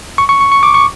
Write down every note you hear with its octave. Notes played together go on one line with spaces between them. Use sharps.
C#6
C#6
C#6
C#6
D6
C#6